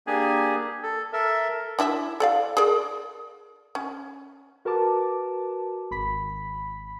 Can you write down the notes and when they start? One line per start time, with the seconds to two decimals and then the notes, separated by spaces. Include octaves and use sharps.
0.07 A#3 D4 G4 G#4 G#5
0.83 A4
1.13 A4 A#4 E5
1.79 D4 E4 E5
2.20 A4 D5 F5
2.57 G#4 A#4 D5
3.75 C#4
4.65 F#4 A#4 B4 A5 D6
5.91 G#1 B5 B6